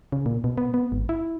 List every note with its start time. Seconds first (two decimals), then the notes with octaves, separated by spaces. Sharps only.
0.12 C#3
0.26 A#2
0.44 B2
0.58 B3
0.74 B3
0.92 G#1
1.09 E4